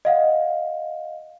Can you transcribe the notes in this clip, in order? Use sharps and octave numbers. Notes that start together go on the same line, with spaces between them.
D#5 F5 F#5